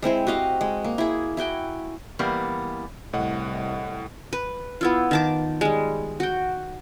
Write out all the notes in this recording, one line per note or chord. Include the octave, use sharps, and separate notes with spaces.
G#3 C4 E4 C5
F#4 G4 D#5 F5
G#3
A#3
E4 G#4
E4 F#4 G5 G#5
E3 G3 A#3 B3
C2 A2 D#5 F#5
B4
B3 E4 F4
D#3 A5 D6
G3 G#3
F#4 G5